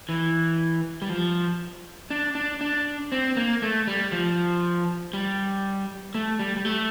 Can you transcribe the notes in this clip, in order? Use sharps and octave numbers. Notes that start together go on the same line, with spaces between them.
E3
G3
F3
D4
D4
D4
C4
A#3
A3
G3
F3
G3
A3
G3
G3
A3